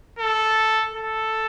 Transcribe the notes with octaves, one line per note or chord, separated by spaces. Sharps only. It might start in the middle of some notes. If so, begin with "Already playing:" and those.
A4
A4